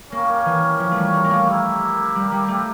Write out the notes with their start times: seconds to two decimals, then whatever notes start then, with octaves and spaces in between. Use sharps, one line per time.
0.11 A#3 C#4 G4 A#4 C#5
0.46 E3
0.79 F3
0.91 G3 A3
1.13 A3
1.24 A#3
1.31 A3
1.47 A#3 E4 G4 A#4
2.16 G3
2.32 G3
2.48 A3